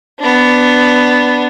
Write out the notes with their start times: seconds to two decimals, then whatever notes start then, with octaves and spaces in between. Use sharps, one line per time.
0.20 B3 D4